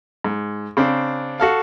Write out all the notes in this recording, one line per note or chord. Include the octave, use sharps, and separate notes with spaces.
G#2
C#3 C4 D4
F#4 A4 F5